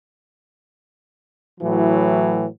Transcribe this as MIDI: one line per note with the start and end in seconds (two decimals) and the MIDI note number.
1.61 2.46 45
1.61 2.46 52
1.61 2.46 54